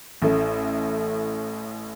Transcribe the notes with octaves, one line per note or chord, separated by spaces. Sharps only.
A1 A2 A3